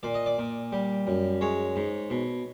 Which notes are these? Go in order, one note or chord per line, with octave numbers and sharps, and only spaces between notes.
A#2 D5
D#5
D5
A#2
G3
F#2
G#3 C#5
G#2
B2